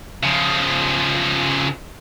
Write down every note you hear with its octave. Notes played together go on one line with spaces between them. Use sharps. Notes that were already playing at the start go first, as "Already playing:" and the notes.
C#3 F3